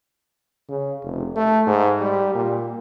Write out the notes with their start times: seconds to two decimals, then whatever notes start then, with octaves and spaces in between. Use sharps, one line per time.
0.69 C#3
1.04 F1
1.36 A3
1.67 G#2
2.01 G3
2.35 A#2